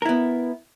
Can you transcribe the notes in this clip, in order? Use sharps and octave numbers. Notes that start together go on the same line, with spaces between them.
B3 E4 A#4